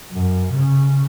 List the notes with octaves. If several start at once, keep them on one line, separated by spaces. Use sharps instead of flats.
F#2
C#3